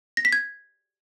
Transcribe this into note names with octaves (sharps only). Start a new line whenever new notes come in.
A#6
B6
G#6